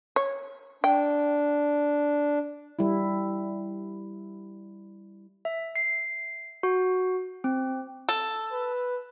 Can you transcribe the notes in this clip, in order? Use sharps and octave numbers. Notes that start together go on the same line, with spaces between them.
C#5
D4 G5
G3 E4
E5
C7
F#4
C4
A4
B4